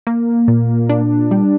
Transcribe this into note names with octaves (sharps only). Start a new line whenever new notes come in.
A#3
A#2
D4
G3